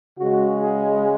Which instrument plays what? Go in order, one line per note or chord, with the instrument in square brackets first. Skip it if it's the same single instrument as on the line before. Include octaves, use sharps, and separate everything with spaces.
[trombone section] C#3 G#3 F#4
G#4